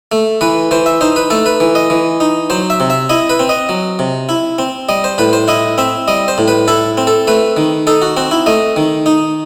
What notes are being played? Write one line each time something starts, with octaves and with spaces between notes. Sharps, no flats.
A3
E3 B4
E3 C5
E5
D#4 C5
B4
A3 A4
B4
E3
D#5
E3
D#4
F#3 C5
E5
C3
E5
E4 D#5
B4
C4
D#5
F#3
C3
E4
C4
G3 D#5
C5
A2 B4
C5
E4 D#5
C4 E5
G3 D#5
C5
A2
B4
E4 A4
C4
A4
A3 B4
D#3
D#4 A4
F#4
C4 F#4
E4
A3 D#5
D#3
D#4